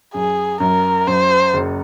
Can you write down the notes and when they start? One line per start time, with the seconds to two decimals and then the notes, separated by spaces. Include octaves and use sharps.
0.14 F#2 G#4
0.60 F#2 A#4
1.06 F#2 C5
1.53 F#1